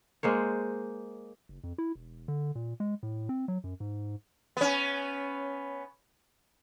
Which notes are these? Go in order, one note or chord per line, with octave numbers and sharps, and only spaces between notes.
G#3 A#3 C5 C#5
F#1
F2
E4
E1
D3
A#2
G#3
A2
C4
F#3
F#2
G#2
B3 C#4